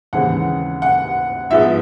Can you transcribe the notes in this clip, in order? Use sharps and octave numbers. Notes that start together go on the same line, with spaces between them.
D#2 C#3 E3 G#3 C4 F#5
F#5
G#2 F3 G#3 B3 E5